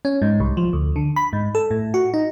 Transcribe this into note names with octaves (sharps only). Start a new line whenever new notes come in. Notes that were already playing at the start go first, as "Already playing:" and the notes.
C#4
G#2
C2
F3
D2
D3
B5
G#2
A4
A2
F#4
D#4